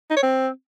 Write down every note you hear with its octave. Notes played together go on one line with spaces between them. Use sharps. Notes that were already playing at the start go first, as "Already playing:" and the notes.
D#4
C#5
C4